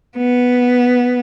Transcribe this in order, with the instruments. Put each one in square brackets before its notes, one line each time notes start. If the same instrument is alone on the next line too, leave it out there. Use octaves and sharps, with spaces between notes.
[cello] B3